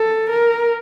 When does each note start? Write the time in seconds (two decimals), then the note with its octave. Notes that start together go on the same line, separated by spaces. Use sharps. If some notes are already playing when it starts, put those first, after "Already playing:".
Already playing: A4
0.30 A#4